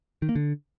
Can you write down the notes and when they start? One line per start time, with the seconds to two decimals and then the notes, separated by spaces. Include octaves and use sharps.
0.22 D#3
0.29 A#3
0.35 D3